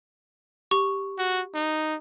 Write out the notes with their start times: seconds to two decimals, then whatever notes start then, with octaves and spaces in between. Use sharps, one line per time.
0.71 G4 C#6
1.19 F#4
1.55 D#4